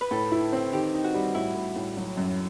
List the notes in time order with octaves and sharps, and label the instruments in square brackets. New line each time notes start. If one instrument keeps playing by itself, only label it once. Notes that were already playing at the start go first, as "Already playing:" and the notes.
[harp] B4
[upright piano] A2 [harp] A4
[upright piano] E4
C4
[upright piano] D#3 [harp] G4
[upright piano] D#4
[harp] F#4
[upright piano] G3
[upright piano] A2 [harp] E4
[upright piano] A2
A2
F#3
F#2